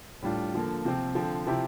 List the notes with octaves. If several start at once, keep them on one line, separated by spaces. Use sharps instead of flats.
A2 G3 D4 F4
D3 F3 A#3
C3 F3 C4
D3 F3 C4
C3 F3 C4 E4 G4